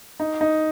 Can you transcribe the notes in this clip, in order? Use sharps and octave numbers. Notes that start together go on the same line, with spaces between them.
D#4
D#4